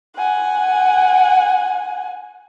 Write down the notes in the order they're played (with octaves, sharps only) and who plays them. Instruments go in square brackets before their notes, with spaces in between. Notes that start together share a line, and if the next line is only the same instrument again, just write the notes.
[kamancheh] F#5 G#5